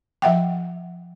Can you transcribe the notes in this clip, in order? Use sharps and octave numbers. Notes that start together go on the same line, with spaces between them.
F3 E5 F#5 G5